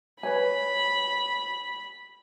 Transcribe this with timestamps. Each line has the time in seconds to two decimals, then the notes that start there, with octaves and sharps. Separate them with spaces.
0.23 B4 C#5 G#5 B5